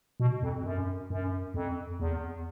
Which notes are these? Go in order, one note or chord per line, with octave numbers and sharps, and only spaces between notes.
B2
F2
F#2
F#2
F2
E2